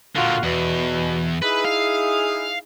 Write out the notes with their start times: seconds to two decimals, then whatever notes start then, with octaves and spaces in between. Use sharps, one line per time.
0.16 A#2 D3 F4 F#4 F5
0.43 E2 B2
1.42 D#4 E4 G#4 B4
1.65 F5